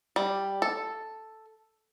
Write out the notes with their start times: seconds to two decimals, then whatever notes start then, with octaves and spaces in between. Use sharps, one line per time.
0.16 G3
0.62 A4